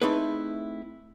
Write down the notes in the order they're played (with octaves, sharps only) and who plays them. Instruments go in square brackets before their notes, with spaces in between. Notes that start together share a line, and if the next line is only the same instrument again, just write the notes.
[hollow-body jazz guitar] A3 C4 D#4 E4 G#4 B4